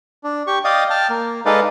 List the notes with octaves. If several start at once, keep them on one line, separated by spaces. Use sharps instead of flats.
D4
G4 C#6
D5 D#5 F5 G5 D#6
G5 A5 F6
A#3
G#3 D#4 A4 B4 D5 F5